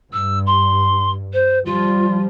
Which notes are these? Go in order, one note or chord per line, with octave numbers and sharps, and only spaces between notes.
G2 E6
C6
C5
F3 G3 F4